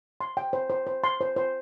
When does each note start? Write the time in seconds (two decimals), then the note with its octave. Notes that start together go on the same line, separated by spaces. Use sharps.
0.21 C6
0.37 G5
0.53 C5
0.70 C5
0.87 C5
1.04 C6
1.21 C5
1.36 C5